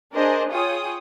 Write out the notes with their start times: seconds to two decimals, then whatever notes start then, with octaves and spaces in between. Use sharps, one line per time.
0.15 D4 G#4 A#4 C5 D#5
0.50 F4 G#4 C#5 G5 D#6